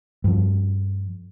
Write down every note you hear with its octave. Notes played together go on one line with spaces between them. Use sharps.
G2 F3